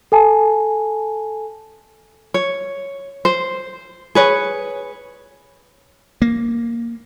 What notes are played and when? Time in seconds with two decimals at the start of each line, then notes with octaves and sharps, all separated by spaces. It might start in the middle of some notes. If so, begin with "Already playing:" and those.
0.12 A4 G#5 A5
2.34 C#5
3.25 C5
4.15 G#4 B4 C#5
6.22 A#3